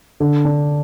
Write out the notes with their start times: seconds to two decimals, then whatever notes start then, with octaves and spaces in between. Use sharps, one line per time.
0.20 D3
0.45 D4